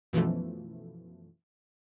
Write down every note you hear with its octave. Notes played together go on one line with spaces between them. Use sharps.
F#2 B2 E3 F3 A3